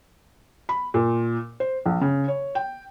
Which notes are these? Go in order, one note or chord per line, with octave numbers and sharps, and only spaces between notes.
B5
A#2
C5
A#1
C#3
C#5
G5